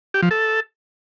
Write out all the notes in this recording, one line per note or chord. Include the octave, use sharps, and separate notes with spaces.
G4
F3
A4